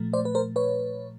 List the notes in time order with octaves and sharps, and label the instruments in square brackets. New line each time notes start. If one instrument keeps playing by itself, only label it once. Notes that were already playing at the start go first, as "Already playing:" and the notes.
Already playing: [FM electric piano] A#2 F3 A3
C5 D5
B4
A#4 C5
B4 C#5